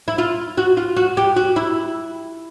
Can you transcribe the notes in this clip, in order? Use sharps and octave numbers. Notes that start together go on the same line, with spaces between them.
E4
F4
F#4
F4
F#4
G4
F#4
E4